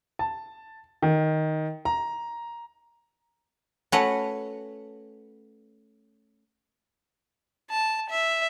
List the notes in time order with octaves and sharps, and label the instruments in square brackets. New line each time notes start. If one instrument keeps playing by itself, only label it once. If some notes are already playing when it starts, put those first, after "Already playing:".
[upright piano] A5
D#3
A#5
[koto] A3 C#4 F#4 B4 C#5 F#5
[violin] A5
E5